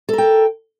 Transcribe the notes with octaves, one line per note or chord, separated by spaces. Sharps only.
A4 A#4 G5